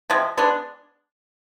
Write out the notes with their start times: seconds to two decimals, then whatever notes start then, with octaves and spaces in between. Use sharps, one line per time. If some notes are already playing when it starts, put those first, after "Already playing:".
0.10 C3 F3 G#3
0.37 G#3 B3 D4